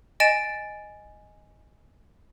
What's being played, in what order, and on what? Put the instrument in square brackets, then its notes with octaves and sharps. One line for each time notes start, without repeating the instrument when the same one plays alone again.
[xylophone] D#5 G#5 A6 D7 E7